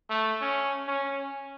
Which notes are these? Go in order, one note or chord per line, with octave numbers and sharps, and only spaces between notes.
A3
C#4
C#4